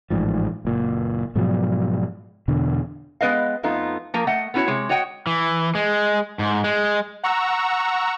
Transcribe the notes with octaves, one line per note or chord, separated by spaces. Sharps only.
A1 G#2 F3
F#1 A#2
G#2 B2 F3 F#3
E2 B2 D3
G#3 B3 B4 D#5 F5
F2 A3 B3 D#4 F4
F3 A#3 A#4
A3 D#5 F#5
B3 C#4 E4 F#4 C#5
C3 G#3 C#5
F#4 C#5 D#5 F#5 G5
E3
G#3
G#2
G#3
F#5 A#5 C#6 E6